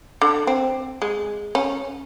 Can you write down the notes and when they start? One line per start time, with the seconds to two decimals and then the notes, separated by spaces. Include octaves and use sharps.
0.21 D3
0.47 C4
1.02 G#3
1.55 C#4